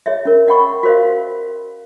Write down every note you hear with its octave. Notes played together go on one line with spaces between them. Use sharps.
G#4 C#5 D#5 E5
C#4 A#4
D#5 F#5 G5 B5 C#6
F#4 A#4 C5 D#5 F5